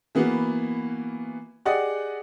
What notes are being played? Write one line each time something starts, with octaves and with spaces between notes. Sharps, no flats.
E3 A#3 B3 F#4
G4 G#4 D5 D#5 F#5